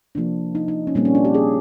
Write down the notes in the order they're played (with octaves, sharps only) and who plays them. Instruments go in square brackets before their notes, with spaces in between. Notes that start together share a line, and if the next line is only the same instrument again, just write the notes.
[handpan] C3 F3 A#3 D4
D#4
D#4
C#4
A#2 G3 A#3 C4
C#4
D4
G4
G#4